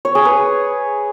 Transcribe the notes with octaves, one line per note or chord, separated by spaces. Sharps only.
C#5
G#4
B4